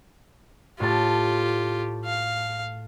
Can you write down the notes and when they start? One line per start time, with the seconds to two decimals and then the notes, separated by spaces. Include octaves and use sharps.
0.80 A2 F4 G4 A5
2.05 F5